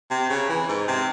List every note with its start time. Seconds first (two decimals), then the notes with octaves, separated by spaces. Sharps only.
0.11 C3
0.30 C#3
0.49 E3
0.69 G#2
0.88 C3